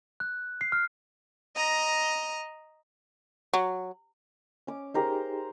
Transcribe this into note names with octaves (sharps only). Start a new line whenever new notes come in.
F#6
C7
F6
D#5 A#5
F#3
C#4 D6
D#4 G4 G#4 A#4 C5